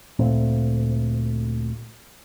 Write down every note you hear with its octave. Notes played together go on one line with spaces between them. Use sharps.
D2 A#2 A3 C4